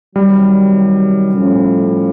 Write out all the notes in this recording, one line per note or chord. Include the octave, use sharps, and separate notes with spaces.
C3 D#3 F#3 G3
A2 F3 A3 C#4